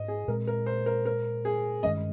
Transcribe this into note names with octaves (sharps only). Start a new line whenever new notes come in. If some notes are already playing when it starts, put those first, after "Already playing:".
Already playing: G#2 D#5
G#4
A#2 G#3 C4 A#4
A#4
C5
A#4
A#4
G#4
G2 D#3 G#3 C#4 D#5